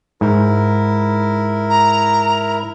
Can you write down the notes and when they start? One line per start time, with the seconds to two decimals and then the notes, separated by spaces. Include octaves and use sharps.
0.21 G#2 E4 A#4
1.70 A#5